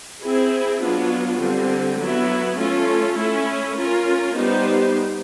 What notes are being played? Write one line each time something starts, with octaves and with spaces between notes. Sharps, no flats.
C4 E4 G#4
F#3 B3 D4 F4
D3 G3 C4
F#3 B3 E4
A3 C#4 F4 A4
A3 C#4 E4
C#4 F4 A#4
G3 B3 D#4 G4 C5